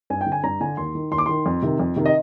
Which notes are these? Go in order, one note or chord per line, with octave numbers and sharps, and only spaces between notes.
G2 G#5
G5
D3
G#5
G2 A#5
D3 G#5
D#2 C6
D#3
D#2 C6
D6
D#3 C6
F2
C3 D#3
F2
C3 D#3
D#5